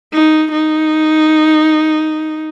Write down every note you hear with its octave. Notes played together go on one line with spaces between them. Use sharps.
D#4
D#4